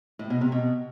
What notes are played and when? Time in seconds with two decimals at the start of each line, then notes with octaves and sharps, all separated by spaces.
0.19 A2
0.30 B2
0.41 C3
0.52 B2